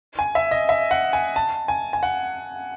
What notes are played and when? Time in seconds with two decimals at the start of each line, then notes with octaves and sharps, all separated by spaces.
0.19 G#5
0.35 E5
0.51 D#5
0.69 E5
0.91 F#5
1.13 G#5
1.36 A5
1.68 G#5
1.93 G#5
2.03 F#5